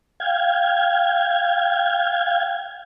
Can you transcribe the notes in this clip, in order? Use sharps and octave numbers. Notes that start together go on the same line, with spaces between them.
F5 G5 G#6